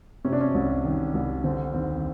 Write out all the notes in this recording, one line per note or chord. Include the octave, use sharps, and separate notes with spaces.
C3 C#4
D4
C#4
C2
D#3
C2
D3 C4
D#2 C4